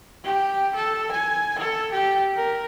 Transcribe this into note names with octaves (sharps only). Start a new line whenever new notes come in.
G4
A4
G#5
A4
G4
A#4